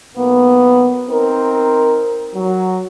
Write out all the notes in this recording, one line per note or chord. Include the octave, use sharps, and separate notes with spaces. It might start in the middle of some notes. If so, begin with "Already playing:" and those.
B1 A#3 B3
C4 D#4 A#4
F#3